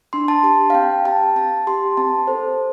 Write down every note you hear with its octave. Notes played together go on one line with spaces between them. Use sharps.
D4 C6
A5
G4 A5
F5
C4 G5
G4 A5
C4 A5
G4 C6
C4 A5
A4 C5